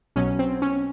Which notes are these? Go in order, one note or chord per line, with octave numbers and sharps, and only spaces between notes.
B1 B2 F#3 C#4
C4
C#4